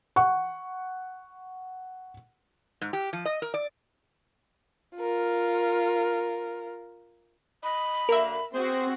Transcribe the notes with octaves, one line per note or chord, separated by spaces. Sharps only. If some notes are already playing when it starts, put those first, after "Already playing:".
F#5 C#6
G#2
G4
F3
D#5
A#4
D5
F4 A#4
D#5 B5
F#2 D3 A#3 A#4 E5
C4 F#4 G#4 C5